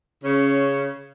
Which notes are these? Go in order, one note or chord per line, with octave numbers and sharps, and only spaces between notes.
C#3 C#4 C#5